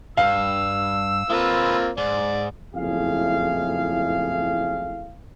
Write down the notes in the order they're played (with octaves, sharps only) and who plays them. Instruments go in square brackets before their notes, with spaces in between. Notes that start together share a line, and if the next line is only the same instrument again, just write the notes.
[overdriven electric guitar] G2 [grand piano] F5 [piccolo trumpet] E6
[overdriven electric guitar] G#3 B4 [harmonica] A#3 C4 F4
[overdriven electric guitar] G#2 [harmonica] D5
[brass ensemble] F#1 F2 A2 E4 G#4 F5